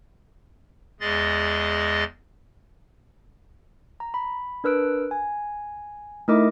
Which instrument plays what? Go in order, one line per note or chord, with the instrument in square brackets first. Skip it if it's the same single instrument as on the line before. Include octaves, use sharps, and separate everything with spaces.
[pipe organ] E2 G#3 G#4 D#5 A6
[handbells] A#5
B5
D4 A#4 B4 E6 F#6 D7
G#5
A3 D#4 E4 A#4 D#5 D6